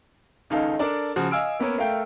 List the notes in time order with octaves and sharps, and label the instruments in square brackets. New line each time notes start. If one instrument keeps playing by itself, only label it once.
[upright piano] C#2 D#3 D#4 A4 F5
D4 A4 A#4 D5
C#3 F3 F#4
D#5 F5 G#5 E6 F6 D7
A#3 B3 C#4 A#4
A3 A#4 F5 G5